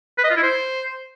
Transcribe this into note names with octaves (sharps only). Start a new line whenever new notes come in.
B4
D#5
F4
E4
C5